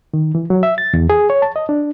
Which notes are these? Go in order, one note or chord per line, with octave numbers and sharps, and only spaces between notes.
D#3
E3
F#3
E5
A6
E2
G#4
C#5
A5
D#5
D4